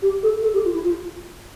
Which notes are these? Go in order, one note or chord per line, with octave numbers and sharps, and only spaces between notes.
G4
A4
A4
G4
F4
E4
F4